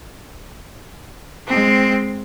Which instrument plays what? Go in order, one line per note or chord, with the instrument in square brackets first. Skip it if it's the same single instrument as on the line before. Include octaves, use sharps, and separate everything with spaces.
[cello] G#3 C4